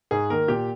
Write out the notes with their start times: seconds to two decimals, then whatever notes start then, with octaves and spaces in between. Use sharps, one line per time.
0.11 G#2 G#4
0.30 D#3 A#3 A#4
0.48 A#2 G4